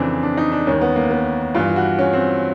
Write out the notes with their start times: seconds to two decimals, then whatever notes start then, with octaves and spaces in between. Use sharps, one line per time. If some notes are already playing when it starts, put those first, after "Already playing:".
Already playing: F2 C#3 E3 C4 D4
0.23 D4
0.37 D#4
0.52 D4
0.67 D#2 D#3 C#4
0.81 B3
0.96 A#3
1.11 B3
1.55 G2 E3 F4
1.70 F4
1.76 F#4
1.99 C#4
2.13 C4